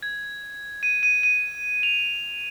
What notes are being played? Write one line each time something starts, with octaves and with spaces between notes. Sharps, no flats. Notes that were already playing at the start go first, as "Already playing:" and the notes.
G#6
D#7
D#7
D#7
F7